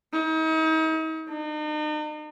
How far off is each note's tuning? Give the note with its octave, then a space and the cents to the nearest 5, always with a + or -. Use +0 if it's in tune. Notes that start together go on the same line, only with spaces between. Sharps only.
D#4 +40
D#4 -40